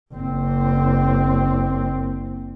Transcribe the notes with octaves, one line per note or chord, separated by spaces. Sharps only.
F#1 C4